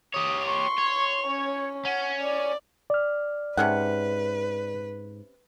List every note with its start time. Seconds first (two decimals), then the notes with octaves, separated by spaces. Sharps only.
0.14 G4 C#5 D#6
0.45 C6 C#6
0.78 C#5
1.27 C#4
1.85 C#4 F#5
2.20 D5
2.90 D5 F6
3.57 G#2 C3 C#4 B4 F#5